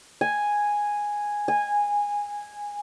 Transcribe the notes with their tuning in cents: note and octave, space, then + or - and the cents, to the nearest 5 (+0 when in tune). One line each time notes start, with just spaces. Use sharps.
G#5 -5
G#5 -15